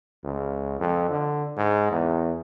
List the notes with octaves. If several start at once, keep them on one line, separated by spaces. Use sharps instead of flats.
C#2
F2
D3
G#2
E2